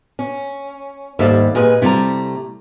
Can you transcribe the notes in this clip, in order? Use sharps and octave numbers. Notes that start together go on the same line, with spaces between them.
C#4
D#2 G#2 G3 A4 E5
A#2 G#4 B4 D#5
C3 G3 A3 E4 A#5